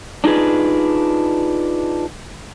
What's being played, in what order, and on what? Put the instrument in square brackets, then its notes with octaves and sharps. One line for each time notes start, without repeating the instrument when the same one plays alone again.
[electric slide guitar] D4 D#4 F4 G#4 B4